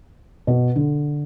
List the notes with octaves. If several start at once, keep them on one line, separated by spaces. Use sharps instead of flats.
B2
D3